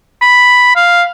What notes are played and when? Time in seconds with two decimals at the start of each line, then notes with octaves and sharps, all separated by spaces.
0.22 B5
0.76 F5